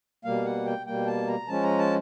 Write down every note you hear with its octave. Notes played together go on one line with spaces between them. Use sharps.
B2 G3 A#3 F5
F#5
G5
B2 G3 A#3 G5
A5
A#5
F3 G#3 C#4 A5
A#5
A5